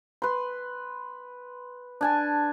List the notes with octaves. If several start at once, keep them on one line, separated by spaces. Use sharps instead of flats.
B4 C6
D4 G#5 A5